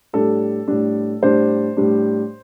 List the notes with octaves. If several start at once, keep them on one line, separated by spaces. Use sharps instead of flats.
A2 G3 D4 A4
A2 G3 D4
A2 G3 D4 C5
A2 G3 D4